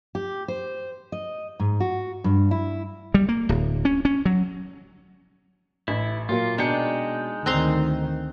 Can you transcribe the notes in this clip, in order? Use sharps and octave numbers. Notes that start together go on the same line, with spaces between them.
G4
C5
D#5
G#2
F#4
G2
E4
G3
A#3
D1
C#4
C#4
F#3
A1 E4
A#2 F#3 A#3 F4
B2 G#3 D4 D#4 G5 C#7
D2 D#3 C4 A#5 C6 F#6